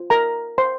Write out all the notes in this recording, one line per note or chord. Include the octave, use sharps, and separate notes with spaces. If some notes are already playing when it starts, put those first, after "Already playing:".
Already playing: F4 C5
A#4 A#5
C5 C6